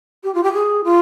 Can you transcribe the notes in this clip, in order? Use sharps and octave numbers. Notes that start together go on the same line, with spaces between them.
G4
F4
G4
G#4
F4